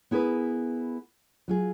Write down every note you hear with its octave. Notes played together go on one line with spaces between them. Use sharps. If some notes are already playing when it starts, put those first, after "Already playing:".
B3 E4 G#4 A#4 B4
F#3 F4 G#4